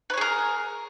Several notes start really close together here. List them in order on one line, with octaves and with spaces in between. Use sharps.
B4 C#5 G#4 A#4